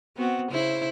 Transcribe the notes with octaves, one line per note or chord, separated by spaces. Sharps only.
B3 C4 F#4
C#3 E4 C5